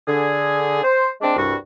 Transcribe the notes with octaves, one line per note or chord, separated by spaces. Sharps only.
D3 G#4
C5
G#3 C4 D4
C2 G2 F#4